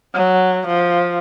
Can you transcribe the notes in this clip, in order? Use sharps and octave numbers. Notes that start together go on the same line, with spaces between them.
F#3
F3